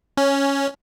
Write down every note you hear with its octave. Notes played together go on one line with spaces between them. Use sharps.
C#4